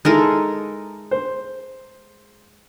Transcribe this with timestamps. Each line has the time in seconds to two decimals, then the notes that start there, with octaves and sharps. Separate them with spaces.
0.05 G#3 D#4 E4 A4 A#4
1.11 C5